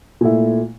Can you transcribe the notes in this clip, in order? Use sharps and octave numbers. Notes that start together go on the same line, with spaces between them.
A#2 A3 E4